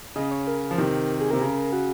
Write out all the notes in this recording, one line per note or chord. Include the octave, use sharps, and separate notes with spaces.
C#3 D#5
C#5
A#4
F3
C3 D#3
G#4
C3 A#4
C#3
F#4